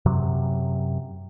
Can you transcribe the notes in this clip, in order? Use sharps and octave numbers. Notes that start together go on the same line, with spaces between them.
F#2 C3 F#3